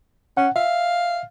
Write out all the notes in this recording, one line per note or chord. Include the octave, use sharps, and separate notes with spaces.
C#4 F#5
E5 F5